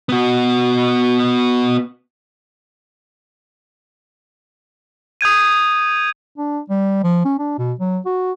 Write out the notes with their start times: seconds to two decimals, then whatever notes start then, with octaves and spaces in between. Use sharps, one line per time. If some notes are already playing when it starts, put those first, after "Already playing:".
0.09 B3 F#4
5.21 D#6 G6 G#6 D#7
6.37 D4
6.70 G3
7.03 F3
7.25 C#4
7.39 D4
7.58 B2
7.80 F#3
8.06 F#4